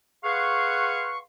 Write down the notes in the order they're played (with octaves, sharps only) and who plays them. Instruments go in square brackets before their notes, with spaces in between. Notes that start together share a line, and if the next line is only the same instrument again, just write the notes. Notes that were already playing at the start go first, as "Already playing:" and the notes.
[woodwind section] G#4 B4 F5 F#5 C6 C#6